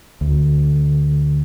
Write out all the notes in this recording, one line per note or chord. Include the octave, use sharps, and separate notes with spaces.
D2